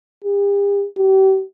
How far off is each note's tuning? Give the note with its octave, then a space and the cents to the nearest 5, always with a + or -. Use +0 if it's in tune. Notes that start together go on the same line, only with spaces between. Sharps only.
G4 +45
G4 -35